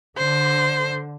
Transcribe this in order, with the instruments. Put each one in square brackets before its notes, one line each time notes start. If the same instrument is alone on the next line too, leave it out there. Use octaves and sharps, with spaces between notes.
[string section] D3 [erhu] C5